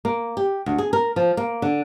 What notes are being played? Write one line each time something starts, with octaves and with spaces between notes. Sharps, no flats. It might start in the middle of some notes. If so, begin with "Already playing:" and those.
A#3
G4
D2
G#4
A#4
F3
A#3
D3